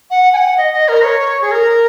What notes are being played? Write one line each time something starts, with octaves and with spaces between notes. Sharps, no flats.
F#5
G#5
F#5
D#5
D#5
A#4
C#5
G#4
A#4